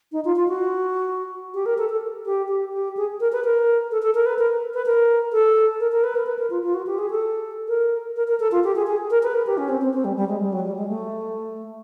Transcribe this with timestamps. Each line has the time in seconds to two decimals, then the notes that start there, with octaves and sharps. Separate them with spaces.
0.12 D#4
0.25 F4
0.36 F4
0.48 F#4
1.54 G4
1.66 A#4
1.78 A4
1.89 A4
2.26 G4
2.48 G4
2.73 G4
2.97 G#4
3.20 A#4
3.32 B4
3.44 A#4
3.91 A4
4.02 A4
4.15 A#4
4.26 B4
4.39 A#4
4.74 B4
4.86 A#4
5.33 A4
5.80 A#4
5.92 A#4
6.04 B4
6.15 A#4
6.26 B4
6.39 A#4
6.50 F4
6.63 F4
6.74 F#4
6.87 G4
6.98 G#4
7.10 A4
7.68 A#4
8.16 A#4
8.28 A#4
8.40 A4
8.52 F4
8.64 G4
8.76 G#4
8.87 G#4
9.10 A#4
9.23 B4
9.34 A#4
9.47 G4
9.58 C#4
9.69 C4
9.82 C4
9.93 C4
10.04 G3
10.16 G3
10.29 G#3
10.41 G3
10.53 F#3
10.64 G3
10.76 G#3
10.88 A3